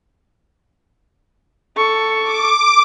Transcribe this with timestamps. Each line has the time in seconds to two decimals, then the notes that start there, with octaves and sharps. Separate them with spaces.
1.76 A4 C#6
2.23 D6